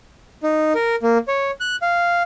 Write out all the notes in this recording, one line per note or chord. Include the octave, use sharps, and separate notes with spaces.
D#4
A#4
A#3
C#5
F#6
F5